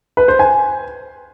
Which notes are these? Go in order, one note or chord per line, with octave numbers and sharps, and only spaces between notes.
B4
C5
G#5